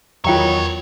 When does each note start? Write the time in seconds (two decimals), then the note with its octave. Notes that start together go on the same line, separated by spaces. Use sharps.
0.24 E2 D#3 F#3 F4 B4 C#5 G5 A#5